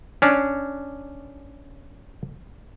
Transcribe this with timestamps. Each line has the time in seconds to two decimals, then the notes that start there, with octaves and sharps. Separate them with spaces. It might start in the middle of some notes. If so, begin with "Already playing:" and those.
0.22 C#4 D4